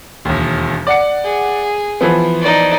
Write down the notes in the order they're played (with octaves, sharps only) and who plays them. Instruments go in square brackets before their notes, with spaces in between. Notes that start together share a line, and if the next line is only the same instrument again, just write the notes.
[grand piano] E1 D#2
D5 F#5 C#7
[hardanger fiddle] G#4
[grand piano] E3 F3 B3
[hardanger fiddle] D#4 D5